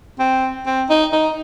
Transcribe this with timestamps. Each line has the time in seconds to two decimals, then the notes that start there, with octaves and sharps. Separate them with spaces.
0.19 C4
0.66 C4
0.90 D#4
1.13 D#4